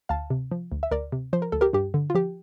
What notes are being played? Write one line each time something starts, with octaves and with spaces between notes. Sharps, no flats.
D2 F5 A5
C3
F3
D2
E5
D2 A#4 D5
C3
F3 C5
A#4
D2 A4
G4 A#4
G2 G4
D3
F4
F3 G4